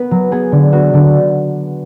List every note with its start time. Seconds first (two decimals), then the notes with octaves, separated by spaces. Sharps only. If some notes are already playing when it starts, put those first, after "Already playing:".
Already playing: B3 B4
0.11 F#3
0.32 B3 G#4
0.52 D3
0.73 B3 F#4
0.94 D3